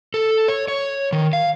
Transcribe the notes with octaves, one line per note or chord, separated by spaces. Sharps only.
A4
C#5
C#5
D#3
F5